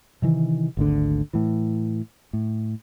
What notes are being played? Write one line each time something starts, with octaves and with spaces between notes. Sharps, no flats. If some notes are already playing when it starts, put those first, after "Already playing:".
C3 D#3 E3
G#1 D2 D3
A2 E3
A2